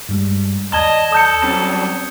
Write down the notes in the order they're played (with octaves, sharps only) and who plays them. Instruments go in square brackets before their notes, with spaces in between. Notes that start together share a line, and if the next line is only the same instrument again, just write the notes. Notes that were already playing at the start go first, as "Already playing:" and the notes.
[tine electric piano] G2 G3 G#3
[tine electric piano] D#2 D5 [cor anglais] D#5 [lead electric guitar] A5 [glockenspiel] G#6 G7
[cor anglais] A4 [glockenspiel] D#6 G6 C#7
[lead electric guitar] F#3 G3 [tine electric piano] C4 C#4